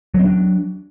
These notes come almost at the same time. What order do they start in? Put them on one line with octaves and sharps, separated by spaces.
F#3 C4 D4